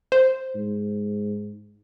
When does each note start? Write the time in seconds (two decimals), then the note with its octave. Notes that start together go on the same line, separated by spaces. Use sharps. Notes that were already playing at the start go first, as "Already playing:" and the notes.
0.12 C5
0.55 G#2